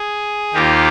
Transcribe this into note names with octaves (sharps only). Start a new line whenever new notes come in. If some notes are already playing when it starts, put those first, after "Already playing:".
Already playing: G#4
D#2 D#3 A#3 F4 G4